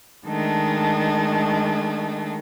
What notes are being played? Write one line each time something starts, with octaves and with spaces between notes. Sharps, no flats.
D#3 G#3 A3 D4